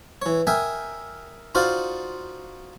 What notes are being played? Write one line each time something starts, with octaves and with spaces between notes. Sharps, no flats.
E3 C#5
A#4 D#5 E5 G5 G#5
D#4 F4 F#4 C5 D5 F5